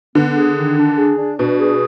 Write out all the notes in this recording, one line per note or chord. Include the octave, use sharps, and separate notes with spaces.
D3 B3
G#4
D#3
D4
G#4
D4
B2 D4
G#4